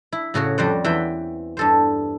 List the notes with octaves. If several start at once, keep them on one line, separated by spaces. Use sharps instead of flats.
E4
A2 C#3 F#4 C#5
F2 G3 F#4 C5 D5 F#5
E2 E3 E5 F#5 G5
G2 A4 C5